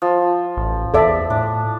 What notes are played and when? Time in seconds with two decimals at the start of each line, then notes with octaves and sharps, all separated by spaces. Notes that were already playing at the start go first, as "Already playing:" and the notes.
0.02 F3
0.57 A1
0.94 E2 A4 D5 E5
1.30 A2 D4